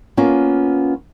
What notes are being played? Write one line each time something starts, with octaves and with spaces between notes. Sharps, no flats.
A#3 B3 C#4 F4